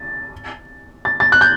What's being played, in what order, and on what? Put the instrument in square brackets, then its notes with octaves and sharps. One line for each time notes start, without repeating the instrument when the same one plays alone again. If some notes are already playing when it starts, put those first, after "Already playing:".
Already playing: [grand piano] A6
A6
A6
F#6
G6